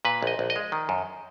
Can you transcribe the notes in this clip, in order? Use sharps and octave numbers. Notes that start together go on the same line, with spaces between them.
A#2 B4
A#1 D#5
A#1
D#5
G#3
D#3
F#2